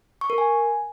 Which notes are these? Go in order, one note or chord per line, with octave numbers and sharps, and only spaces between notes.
C#6
A#4
G#5